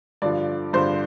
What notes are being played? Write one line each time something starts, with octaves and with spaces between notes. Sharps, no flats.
G2 D3 F3 D5
G2 D3 F3 C5